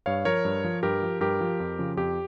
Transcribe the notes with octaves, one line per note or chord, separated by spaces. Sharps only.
G2 C#5 F5
F3 A#4 C#5
G2
F3
G2 G4 A#4
F3
G2 G4 A#4
F3
F2
C#3 F3
F2 G4